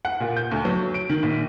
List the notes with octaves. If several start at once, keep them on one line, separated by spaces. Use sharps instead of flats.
F#5
A#2
G6
D2
F#3
D7
D#3
A#1